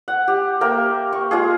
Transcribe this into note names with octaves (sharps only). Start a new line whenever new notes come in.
F#5
G4
A#3 A#4 E5 G5
C#6
G#3 F4 G#4